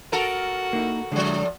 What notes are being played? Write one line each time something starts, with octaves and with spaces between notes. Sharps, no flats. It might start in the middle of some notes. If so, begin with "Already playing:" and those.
F#4 A4 A#4
A#3 D#4 E4
A2 D3 F3 G#3